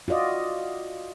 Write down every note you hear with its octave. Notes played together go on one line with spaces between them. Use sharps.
F4 F#4 D5 D#5